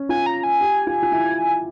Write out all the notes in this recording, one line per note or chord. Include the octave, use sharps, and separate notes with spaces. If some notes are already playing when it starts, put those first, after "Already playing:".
Already playing: C#4
F4 G#5
A#5
G#5
G4
F4
F4
E4